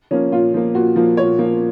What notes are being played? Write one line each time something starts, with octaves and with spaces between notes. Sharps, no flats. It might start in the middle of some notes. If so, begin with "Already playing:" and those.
F3 A#3 C#4
A#2 F4
F3 A#3
A#2 F#4
F3 A#3
A#2 C#5
F3 A#3